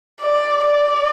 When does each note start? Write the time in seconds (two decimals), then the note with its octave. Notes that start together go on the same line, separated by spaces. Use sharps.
0.20 D5
0.66 D5